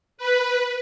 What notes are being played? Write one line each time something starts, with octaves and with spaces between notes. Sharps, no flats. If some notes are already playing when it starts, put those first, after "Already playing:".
B4